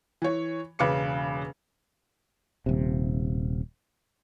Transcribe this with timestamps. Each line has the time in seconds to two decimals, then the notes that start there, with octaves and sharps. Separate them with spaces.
0.22 E3 C#5
0.79 E1 C#3 B4 D6 C#7
2.66 D#1 C3